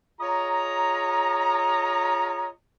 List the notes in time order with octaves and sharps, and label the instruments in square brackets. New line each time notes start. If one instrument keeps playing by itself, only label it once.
[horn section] F4 G#4 C#5 D#5 A#5